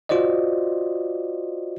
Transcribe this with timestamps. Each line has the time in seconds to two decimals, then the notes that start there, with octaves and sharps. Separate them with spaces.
0.09 F4 F#4 C5 D5 D#5